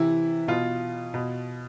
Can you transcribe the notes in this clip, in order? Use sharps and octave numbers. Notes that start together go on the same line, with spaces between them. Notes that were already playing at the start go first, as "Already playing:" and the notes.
Already playing: C3 E3 E4
B2 F4
B2